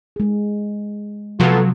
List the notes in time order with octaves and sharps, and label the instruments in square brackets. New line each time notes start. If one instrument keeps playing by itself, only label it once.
[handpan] G#3 G#4
[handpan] C3 [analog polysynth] F3 F#3 [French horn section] B3 F4 A4